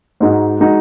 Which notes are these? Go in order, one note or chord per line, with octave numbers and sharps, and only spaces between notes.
G#2 G#3 D#4 F#4
G#3 D#4 F#4